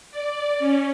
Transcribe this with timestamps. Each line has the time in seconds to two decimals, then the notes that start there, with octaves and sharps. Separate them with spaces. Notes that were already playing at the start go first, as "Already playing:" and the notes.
0.11 D5
0.59 C#4